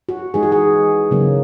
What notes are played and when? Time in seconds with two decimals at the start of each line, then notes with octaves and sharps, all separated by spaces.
0.09 F#4
0.34 E3 G#3 D#4 G#4
0.43 F#4
0.52 G#4
1.11 C#3 F#3 A#3